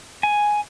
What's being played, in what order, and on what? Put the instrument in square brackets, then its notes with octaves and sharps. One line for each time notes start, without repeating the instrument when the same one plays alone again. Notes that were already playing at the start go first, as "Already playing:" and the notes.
[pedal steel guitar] G#5